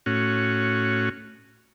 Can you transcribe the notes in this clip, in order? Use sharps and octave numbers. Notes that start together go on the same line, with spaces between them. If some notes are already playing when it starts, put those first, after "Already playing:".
A2 C#4 F#4